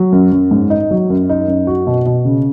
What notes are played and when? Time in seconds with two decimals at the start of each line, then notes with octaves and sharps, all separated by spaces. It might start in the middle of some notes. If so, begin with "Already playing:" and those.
Already playing: F#3
0.12 F#2
0.32 F#2
0.51 G#2
0.70 D#4
0.91 F#3
1.10 F#2
1.29 D#4
1.48 F#2
1.67 F#4
1.87 B2
2.06 B2
2.25 C#3